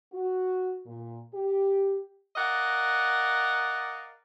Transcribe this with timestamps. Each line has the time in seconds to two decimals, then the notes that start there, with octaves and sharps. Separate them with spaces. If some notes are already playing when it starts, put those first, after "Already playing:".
0.13 F#4
0.86 A#2
1.34 G4
2.36 A#4 D5 D#5 F5 F#5